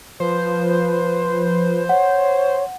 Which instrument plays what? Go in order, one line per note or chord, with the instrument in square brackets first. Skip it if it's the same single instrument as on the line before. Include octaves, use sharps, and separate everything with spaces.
[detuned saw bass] F3 [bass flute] B4 [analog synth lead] C5
[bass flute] C#5 [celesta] F#5